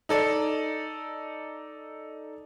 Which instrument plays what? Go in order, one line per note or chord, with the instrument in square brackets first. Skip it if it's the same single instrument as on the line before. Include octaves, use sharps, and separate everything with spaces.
[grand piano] D#4 A4 D5